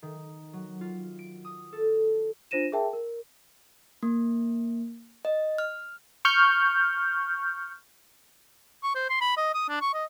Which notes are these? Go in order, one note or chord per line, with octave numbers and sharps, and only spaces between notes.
D#3
F#3
F4
D7
D#6
A4
D4 F4 C5 A#6 D#7 E7
G#4 A#4 E5 G5 A5
A#4
A#3
D#5
F6
C#6 F6 G6
C#6
C5
C6
B5
D#5
D#6
D4
C#6
D#5